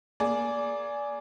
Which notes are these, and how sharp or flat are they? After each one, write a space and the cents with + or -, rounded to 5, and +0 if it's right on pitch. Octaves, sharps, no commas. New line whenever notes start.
A#3 +25 G#4 +5 D5 -15